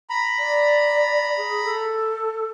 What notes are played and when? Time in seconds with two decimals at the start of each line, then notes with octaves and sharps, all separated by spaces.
0.10 A#5 B5
0.39 D5
1.37 G#4
1.65 A4